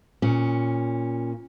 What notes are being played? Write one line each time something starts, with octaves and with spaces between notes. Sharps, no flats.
A#2 C#4